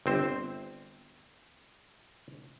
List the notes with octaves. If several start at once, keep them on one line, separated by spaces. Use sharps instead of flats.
G1 C4 C5